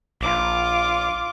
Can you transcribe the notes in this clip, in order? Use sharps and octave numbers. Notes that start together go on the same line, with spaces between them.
A#1 F4 D6